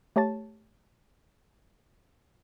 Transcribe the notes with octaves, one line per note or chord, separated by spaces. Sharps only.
A3 G4 C#5 A5 A6